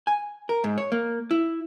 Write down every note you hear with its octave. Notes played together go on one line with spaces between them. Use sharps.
G#5
A#4
G#2
C#5
A#3
E4